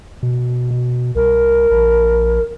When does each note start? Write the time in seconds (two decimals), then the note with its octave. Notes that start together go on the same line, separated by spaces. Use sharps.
0.23 B2
0.71 B2
1.15 C2 A#4
1.71 A#1